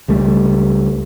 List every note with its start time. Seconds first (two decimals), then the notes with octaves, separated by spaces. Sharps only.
0.08 C#2 G3 A3